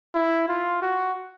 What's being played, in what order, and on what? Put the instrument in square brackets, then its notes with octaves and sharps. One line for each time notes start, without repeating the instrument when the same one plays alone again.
[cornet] E4
F4
F#4